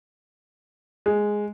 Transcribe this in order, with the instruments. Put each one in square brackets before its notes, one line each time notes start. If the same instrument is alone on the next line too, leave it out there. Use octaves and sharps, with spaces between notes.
[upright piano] G#3